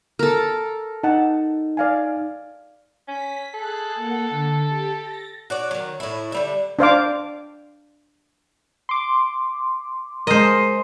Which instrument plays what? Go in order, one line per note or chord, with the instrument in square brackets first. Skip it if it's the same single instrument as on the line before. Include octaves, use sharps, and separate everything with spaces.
[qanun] A4 A#4
[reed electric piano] D#4 [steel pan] F#5 A5
[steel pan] D5 F5 G#5
[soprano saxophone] C#4 [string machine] B6
[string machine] G#4 F#6 [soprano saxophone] A4
[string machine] A#3 F#5
D3
G4
A6 A#6
[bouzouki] F#4 C#5 D5
D#3 F#3
A2 E4
D3 G3 E5
[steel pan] D4 C5 F5 D6
[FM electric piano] C6 D6
[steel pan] G#3 A#4 [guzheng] C5 D#5